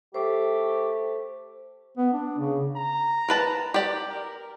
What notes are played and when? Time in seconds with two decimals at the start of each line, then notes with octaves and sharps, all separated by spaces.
0.14 A3 G4 C5
1.97 B3
2.13 D4
2.39 C#3
2.76 A#5
3.28 A#4 B4 A5
3.74 G4 D5
4.09 A#4